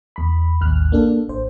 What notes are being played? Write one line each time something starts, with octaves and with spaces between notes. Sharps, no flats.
E2 B5
A1 D#2 F6 F#6
A#3 D4 A4
A1 C5